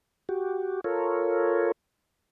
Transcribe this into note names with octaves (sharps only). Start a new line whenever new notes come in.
F#4 G4
F4 A4 A#4 C#5